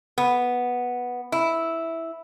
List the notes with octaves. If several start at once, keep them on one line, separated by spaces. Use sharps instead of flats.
B3
E4